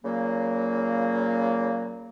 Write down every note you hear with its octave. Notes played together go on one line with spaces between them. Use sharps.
A#2 C#3 F#3 A#3